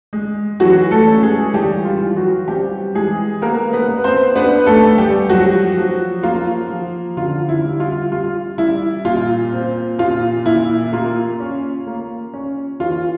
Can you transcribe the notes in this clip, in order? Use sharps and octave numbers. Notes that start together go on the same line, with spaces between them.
G#3
E3 F#3 F#4
A3 A4
C#4
G#3 G#4
E3 G3 G4
F4
E3
F#3 F#4
G3 C4 G4
E3 G#3 G#4
A#3 B3 A#4
B3 B4
B3
C4 C5
B3 D4 B4
A3 A4
B3
G3 G4
F3 F#3 F#4
F3
A#3 F4
F3
D3 F4
E4
G3
F4
G3 F4
G3 E4
A#2 F4
C4
A#2 F4
A#2 E4
A#3 F4
C#4
A#3
C#4
E3 F4